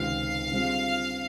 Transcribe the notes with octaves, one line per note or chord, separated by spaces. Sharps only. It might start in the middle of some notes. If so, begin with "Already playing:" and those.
Already playing: C#2 C3 D#3 G#3 C4 F5
D3 G3 C4 F4 G#4